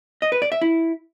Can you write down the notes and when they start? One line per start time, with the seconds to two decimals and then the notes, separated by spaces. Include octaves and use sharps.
0.22 D#5
0.32 B4
0.42 D5
0.52 E5
0.62 E4